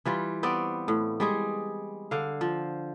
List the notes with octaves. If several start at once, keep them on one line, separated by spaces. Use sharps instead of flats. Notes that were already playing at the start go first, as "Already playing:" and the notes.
E3 G3 F4
B3 C4 D5
A2
G3 G#3 G#4
D3 F5
F3